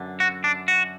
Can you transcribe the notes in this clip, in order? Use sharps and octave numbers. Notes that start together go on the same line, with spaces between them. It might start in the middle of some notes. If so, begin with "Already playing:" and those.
Already playing: F#2 D3
F#4
D4
F#4